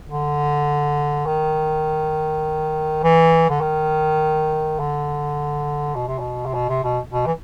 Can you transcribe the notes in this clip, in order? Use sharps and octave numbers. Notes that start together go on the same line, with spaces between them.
D3
D#3
E3
D3
D#3
D3
B2
C3
B2
C3
B2
C3
B2
B2
E3